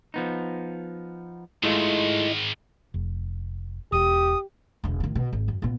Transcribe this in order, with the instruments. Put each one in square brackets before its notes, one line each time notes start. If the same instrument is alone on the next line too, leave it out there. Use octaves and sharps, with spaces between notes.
[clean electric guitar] F3 B3 D#4
[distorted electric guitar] G#2 D#3 [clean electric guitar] G#3 A3 F4 [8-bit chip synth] E4 D#5
[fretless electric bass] F1
[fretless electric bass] E1 [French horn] G4 [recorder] D#6
[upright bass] E1 D3
A2 D#3
B2
G#1
F#2
A#2 B3